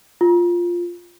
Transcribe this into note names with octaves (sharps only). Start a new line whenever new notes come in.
F4